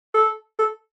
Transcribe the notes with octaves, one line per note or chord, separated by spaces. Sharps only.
A4
A4